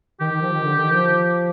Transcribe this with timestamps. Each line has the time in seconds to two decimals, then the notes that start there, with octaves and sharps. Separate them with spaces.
0.20 D#3 G4
0.31 D#3
0.42 F3
0.53 D#3
0.63 D3
0.78 D#3
0.91 F3